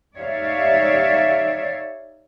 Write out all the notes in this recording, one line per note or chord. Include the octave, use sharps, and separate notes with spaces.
D#4 G4 C#5 D5 E5 F5